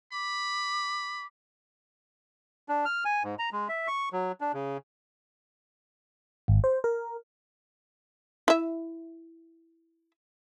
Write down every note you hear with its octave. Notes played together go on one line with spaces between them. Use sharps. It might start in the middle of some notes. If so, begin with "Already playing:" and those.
B5 D6
D4
F6
G#5
G#2
A#5
G#3
E5
C#6
F#3
D4
C#3
G#1
C5
A#4
E4 E5